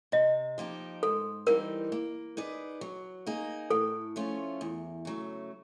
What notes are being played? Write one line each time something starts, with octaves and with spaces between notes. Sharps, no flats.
C3 D#5
F3 A#3 D#4 G4
G#2 A4
E3 G3 C4 D#4 A#4
A#3
D#4 G#4 B4 D5
F#3
A#3 D#4 G#4
A2 A4
F3 A3 C#4 F4
E2
C#3 F#3 A3